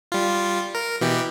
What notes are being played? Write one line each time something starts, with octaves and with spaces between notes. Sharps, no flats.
G3 F4
A#4
B2 E3 G4